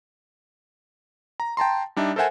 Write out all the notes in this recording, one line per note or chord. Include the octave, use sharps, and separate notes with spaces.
A#5
G5 A5 A#5 C6
G3 D4 D#4 E5
A4 A#4 C5 E5 F#5 G#5